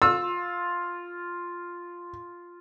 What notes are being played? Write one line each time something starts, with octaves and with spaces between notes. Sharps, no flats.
F4 E6